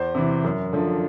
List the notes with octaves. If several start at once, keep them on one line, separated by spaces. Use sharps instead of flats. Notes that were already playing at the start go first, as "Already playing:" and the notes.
Already playing: E2 C5
C3 E3
F#2
D3 F3